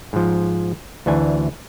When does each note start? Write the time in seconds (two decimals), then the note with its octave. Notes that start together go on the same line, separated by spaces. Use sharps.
0.13 G#2 F3
1.06 D2 E3 D4 G#5